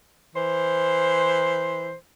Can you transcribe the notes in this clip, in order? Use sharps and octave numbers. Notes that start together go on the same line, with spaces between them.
E3 C5